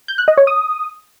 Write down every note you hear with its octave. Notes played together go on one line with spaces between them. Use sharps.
G6
F#6
D#5
C#5
D#6